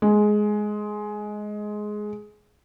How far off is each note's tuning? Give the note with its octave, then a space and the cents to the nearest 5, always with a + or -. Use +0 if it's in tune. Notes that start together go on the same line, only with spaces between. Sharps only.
G#3 +10